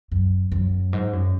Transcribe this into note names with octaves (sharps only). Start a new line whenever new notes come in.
F#2
F#2
G#2
F#2